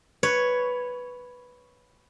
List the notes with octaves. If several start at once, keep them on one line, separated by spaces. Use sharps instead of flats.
B4 C#5